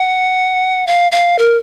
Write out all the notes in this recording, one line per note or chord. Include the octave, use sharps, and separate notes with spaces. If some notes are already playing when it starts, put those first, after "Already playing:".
Already playing: F#5
F5
F5
A#4